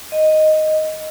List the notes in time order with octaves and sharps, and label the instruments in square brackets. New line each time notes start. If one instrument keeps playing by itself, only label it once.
[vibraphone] D#5